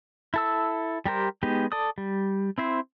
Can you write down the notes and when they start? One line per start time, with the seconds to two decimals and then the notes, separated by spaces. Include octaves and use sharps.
0.34 E4 A4 E6
1.06 G3 G4 A#4 C5
1.43 G#3 B3 D#4 G4
1.72 A4 D5 D#6
1.98 G3
2.58 C4 E4 C5